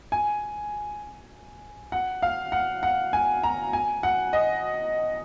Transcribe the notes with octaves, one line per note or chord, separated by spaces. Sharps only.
G#5
F#5
F5
F#5
F#5
G#5
A#5
G#5
F#5
D#5